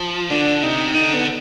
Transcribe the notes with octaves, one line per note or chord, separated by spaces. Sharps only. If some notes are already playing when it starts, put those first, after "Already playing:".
Already playing: F3
D3 D4
C3 D#4
D3 D#4
B3